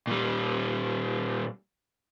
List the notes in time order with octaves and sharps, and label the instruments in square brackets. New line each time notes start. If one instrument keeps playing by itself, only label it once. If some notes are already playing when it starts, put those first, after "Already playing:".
[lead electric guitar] A#2 G3